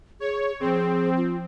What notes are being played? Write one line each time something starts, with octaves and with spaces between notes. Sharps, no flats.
G#4 C#5
F3 C4 G#4
F4